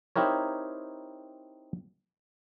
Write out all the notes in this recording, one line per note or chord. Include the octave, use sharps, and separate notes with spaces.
C4 D#4 E4 G4 A#4 C#5